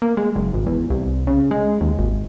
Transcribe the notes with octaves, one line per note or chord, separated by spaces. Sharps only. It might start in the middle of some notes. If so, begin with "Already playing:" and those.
A#3
G#3
F#1
G#1
E2
C2
C#3
G#3
D#2
G#1